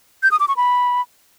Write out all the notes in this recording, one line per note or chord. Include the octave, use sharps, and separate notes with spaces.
G6
D#6
D6
C#6
B5